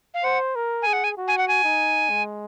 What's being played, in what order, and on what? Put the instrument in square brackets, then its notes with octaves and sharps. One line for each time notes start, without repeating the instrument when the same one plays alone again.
[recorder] F5
[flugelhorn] C5 [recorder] F#5
[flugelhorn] A#4
[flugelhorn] G#4 [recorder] G#5
[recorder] F#5
G#5
[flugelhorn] F#4
[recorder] G#5
F#5
G#5
[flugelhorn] D#4
G#3